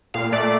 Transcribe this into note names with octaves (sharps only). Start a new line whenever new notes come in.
A#2 F5
A3 D5